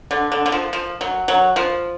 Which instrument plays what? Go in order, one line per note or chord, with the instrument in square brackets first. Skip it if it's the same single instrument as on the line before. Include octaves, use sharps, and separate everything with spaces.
[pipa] D3
D3
D3
F3
F3
F#3
F#3
F3